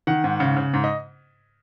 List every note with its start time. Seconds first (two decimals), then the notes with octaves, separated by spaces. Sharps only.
0.07 D#3 F#5
0.24 G#2
0.40 C#3
0.57 C#3
0.74 G#2
0.84 D#5